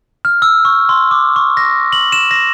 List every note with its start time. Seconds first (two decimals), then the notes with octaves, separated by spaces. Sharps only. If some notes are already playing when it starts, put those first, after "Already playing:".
0.25 F6
0.42 E6
0.65 C#6
0.89 C6
1.11 D6
1.36 C#6
1.57 A#6
1.92 F#7
2.12 E7
2.31 A#6